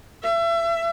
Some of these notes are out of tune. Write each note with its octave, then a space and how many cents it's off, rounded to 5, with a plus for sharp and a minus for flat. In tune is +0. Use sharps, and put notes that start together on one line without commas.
E5 +35